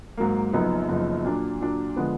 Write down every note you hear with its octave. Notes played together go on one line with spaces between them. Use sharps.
G#2 F#3 A#3
F#1 F#2 F3 B3 D#4
F#1 F#2 F3 B3 D#4
A#2 F#3 D4
A#2 F#3 D4
D3 F3 G#3 B3